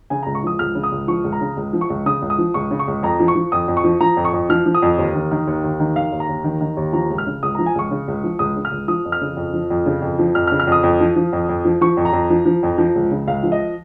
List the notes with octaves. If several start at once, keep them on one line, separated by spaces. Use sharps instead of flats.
C#3 G#5
C#2 A#5
C#6
F3 D#6
C#2 F6
C#3
D#6
C#2
F3 C#6
C#2
A#5
C#3
C#2
F3
C#6
C#2
C#3 D#6
C#2
D#6
F3
C#2 C#6
C#3
C#6
C#2
F2 A#5
F3
C#6
F3
F2 D#6
F2
C#6
F3
F3 A#5
F2
C#6
F2
F3 F6
F3
D#6
F2
D#2
D#3
D#3
D#2
D#2
D#3
D#3 F5
D#2
A#5
D#2
D#3
D#3
D#2
F3 A#5
C#2
F6
C#3
C#2 D#6
F3 A#5
G#5
C#2 C#6
C#3
C#2
F3
C#2 D#6
C#3
F6
C#2
F3 D#6
F2
F6
C#3
F2
F3
F2
C#3
F2
F3
F2 F6
F6
C#3
F6
F2 D#6
F2
F3
F3
F2
F2
F3
F3 C#6
F2
A#5
F2
F3
F3
F2
F3
C#2
C#3
C#2 F5
F3
D#5